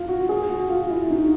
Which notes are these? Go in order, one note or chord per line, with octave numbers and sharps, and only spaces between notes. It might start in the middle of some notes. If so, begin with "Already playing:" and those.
Already playing: F4
F#4
G#4
F#4
F4
E4
D#4